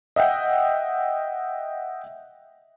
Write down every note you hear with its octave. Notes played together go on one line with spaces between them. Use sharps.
D#5 E5 F#5 G5